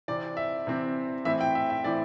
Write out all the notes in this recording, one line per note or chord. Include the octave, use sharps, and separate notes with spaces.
C3 E3 C4 D5
E5
C3 E3 C4
A2 E3 C4 E4 E5
G5
E5
E5
A2 E3 C4 E4 D5